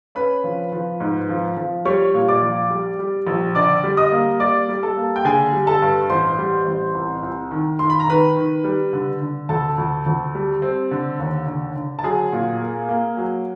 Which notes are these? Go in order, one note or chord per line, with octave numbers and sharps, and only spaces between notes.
C#4 B4 B5
F3
F3
G#2
F3
F3
G3 C#5 C#6
A#2
D5 D6
A#1
G3
G3
A#1
D3 D5 D6
G3
D#5 D#6
A#3
G3 D5 D6
G3
A4 A5
A#3
G5
D3 G#4 G#5
G3
A4 A5
G2
A1 C5 C6
G3
A1
C2
C2
D#3
D#3 C6
B5
A#5
D#3 B4 B5
D#3
G3
D3
D3
D2 A4 A5
D2
D2
G3
C4
D3
D#2
D3
D3
A5
F#3 G#4 G#5
A#2
A#3
A#3
F#3